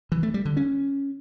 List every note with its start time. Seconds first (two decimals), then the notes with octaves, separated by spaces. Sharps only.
0.12 E3
0.23 A3
0.34 G3
0.45 D3
0.57 C#4